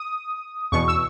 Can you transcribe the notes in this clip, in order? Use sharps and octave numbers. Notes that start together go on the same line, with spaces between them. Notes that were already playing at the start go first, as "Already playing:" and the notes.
Already playing: D#6
E2 B2 C#6
E6